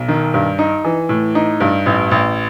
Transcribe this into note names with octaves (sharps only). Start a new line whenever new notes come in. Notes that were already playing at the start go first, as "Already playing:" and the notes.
Already playing: B1
D#3
G2
D#4
E3
A2
D#4
G2
A1
A1